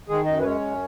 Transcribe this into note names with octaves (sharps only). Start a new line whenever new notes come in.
D#3 G#3 G#4
F#2 D#4 D#5
B4
G#3 C#4 C#5
F#2